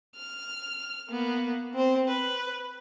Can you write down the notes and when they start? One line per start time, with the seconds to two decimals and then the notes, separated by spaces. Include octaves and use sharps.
0.17 F6
1.10 A#3 B3
1.74 C4 C5
2.08 B4